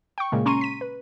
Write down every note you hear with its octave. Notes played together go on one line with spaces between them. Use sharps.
G5 C#6
A#2 C#3 G#3 A#3
C#4 A#5 C6 C#6 D#7
B6 D#7
B4